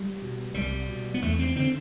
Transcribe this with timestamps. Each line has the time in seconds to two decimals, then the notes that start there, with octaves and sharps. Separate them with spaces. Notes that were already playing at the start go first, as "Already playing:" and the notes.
Already playing: G3
0.22 B2
0.54 C2 G3
0.88 B2
1.14 B3
1.22 E2 A3
1.39 C4
1.55 D3 C4